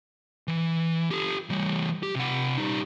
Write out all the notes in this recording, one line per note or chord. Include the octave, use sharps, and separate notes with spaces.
E3
G4 A4
E3 G3
G4
C3 F#5
G3 D#4